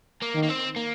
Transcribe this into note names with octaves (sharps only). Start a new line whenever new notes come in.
A#3
D#3
A#3
C4
A#3